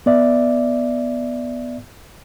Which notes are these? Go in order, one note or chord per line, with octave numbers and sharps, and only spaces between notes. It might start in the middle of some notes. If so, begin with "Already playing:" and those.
B3 D5 E5